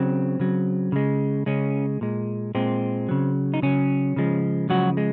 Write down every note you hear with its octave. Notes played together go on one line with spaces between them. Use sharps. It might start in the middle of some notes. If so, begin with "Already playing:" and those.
Already playing: C#3 F#3 C4
C#3 F#3
C#3 G#3
C#3 G#3 C#4
A#2 G#3
A#2 G#3 C4
C#3 F#3
D#4
C#3 F#3 C#4
C#3 F3 G#3
C#3 F3 F#3 G#3 F#4
G#3